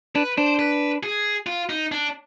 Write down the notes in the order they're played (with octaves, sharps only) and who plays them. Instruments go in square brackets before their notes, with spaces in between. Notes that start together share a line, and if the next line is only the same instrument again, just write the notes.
[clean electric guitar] D4 [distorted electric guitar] B4
[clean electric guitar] D4 [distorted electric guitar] C5
[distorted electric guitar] B4
G#4
F4
D#4
D4